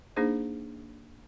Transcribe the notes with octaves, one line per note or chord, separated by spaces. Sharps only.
A#3 D4 D#4 G#4 C5